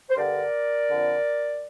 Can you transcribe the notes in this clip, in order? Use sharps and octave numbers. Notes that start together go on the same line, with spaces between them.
C5
G2 D3 A#4 D5
F2 D3